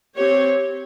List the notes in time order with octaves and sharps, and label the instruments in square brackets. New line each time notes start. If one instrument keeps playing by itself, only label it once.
[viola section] C4 G4 C#5